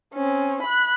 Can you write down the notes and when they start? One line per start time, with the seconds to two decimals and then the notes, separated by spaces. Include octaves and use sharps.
0.14 C4 C#4
0.63 B5 F#6